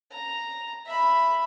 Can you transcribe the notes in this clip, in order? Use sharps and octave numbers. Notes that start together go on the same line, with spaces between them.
A#5
E5 B5